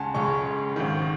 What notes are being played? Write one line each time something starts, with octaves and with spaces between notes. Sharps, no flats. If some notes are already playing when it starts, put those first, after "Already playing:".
Already playing: C#2 C#3 G#3 F#5 G#5 A5
C#2 C#3 G#3 C#6
G#1 G#2 D#3